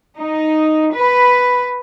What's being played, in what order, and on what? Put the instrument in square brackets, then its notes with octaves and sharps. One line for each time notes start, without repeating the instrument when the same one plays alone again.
[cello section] D#4
B4